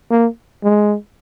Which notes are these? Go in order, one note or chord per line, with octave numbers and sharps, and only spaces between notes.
A#3
G#3